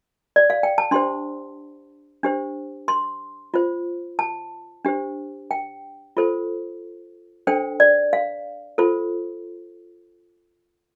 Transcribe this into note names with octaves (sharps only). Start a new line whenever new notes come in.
D5
F5
G5
A5
D4 G4 C5 C6
D4 G4 C5
C6
F4 C5
A5
D4 G4 C5
G5
F4 A4 C5
D4 A4 C5 G5
D5
F5
F4 A4 C5